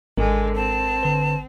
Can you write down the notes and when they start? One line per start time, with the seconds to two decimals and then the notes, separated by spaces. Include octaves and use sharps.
0.17 G#1 G#2 D3 G#3 A#4
0.56 C4 A5
1.03 D3 B4